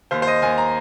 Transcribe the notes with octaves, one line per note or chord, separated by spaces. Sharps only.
D#2 C5
C5
D#5
D#2 G#5
A#5